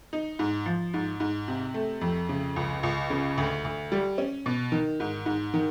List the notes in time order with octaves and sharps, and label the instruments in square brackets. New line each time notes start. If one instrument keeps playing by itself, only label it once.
[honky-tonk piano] D#4
G#2
F3
G#2
G#2
C3
A3
F2
C#3
C#2
C#2
C#3
D2
D2
G3
C#4
B2
D#3
G#2
G#2
D#3